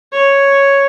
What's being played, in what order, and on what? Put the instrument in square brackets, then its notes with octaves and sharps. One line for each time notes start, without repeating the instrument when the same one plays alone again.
[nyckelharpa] C#5